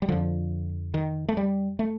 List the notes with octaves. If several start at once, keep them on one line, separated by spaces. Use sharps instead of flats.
G3
F2 D3 F3
D#3
A3
G3
A3